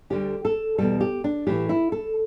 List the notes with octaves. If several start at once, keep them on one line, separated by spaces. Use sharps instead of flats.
D2 D3 G3 G4
A4
E2 B2 G3 A4
G4
D4
A2 E3 A3 G4
E4
A4